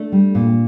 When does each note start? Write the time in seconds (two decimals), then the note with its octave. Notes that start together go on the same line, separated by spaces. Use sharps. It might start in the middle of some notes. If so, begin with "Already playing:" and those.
Already playing: A3 D4
0.12 G3
0.35 A#2